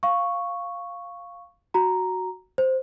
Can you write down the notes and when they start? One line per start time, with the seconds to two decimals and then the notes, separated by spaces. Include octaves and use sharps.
0.03 F5 C#6
1.74 F#4 A#5
2.58 C5